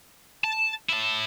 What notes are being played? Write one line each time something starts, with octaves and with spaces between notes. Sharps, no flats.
A5
E4 A5